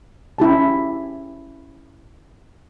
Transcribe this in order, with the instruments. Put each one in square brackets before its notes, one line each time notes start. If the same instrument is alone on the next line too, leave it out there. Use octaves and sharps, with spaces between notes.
[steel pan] C#4 E4 G4 A5